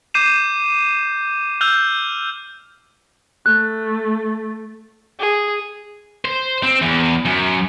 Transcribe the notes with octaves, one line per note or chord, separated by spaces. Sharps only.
D6 G6 C7 D#7 E7
E6 F6 G6 F7
A3 F#6
G#4
C5
C4
E2
F#2